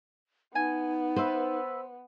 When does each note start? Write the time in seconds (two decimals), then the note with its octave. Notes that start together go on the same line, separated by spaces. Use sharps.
0.55 B3 D#4 G#5
1.16 B4 C5 E5